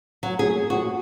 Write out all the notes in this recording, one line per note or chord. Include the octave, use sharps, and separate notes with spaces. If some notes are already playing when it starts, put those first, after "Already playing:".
F#3
G#4
F#4